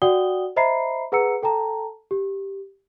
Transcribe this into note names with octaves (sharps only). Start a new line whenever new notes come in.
F#4 D5 F#5 G5 D#6 G7
C5 D#5 E5 A#5 B5 C7
G#4 B4 F#5 A#5 E6 C#7
A4 G5 A5 A#5
G4